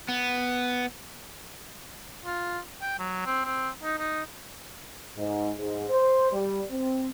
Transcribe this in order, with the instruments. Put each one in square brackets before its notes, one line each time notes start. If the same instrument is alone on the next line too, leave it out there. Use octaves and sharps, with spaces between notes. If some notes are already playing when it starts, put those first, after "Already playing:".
[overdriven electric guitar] B3
[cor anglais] F4
G5
F#3
C4
C4
D#4
D#4
[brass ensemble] G#2
G#2
C5
G3
C4